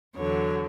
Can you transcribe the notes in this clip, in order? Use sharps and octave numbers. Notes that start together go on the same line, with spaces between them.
E2 D3 F#3 C#5